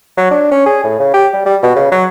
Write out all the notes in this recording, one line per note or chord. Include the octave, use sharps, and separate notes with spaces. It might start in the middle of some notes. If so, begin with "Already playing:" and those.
F#3
D4
C#4
G#4
A2
C#3
G4
G3
G3
B2
C#3
F#3